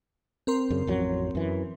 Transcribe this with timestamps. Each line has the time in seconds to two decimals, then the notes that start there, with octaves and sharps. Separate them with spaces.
0.47 C4 A#4 C6
0.70 F#2 C#3
0.87 A1 F2 F#3
1.35 F#2 E3